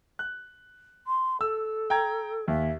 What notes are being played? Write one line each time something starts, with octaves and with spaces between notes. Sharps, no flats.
F#6
C6
A4 E6
G5 A#5 G#6
D#2 E5